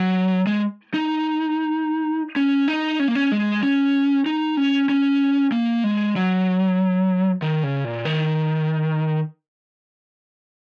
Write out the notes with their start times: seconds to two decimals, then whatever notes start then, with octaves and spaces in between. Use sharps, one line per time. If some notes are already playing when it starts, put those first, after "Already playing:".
Already playing: F#3
0.47 G#3
0.94 D#4
2.36 C#4
2.68 D#4
3.00 C#4
3.08 A#3
3.15 C#4
3.32 G#3
3.63 C#4
4.26 D#4
4.57 C#4
4.89 C#4
5.52 A#3
5.84 G#3
6.16 F#3
7.42 D#3
7.64 C#3
7.85 A#2
8.05 D#3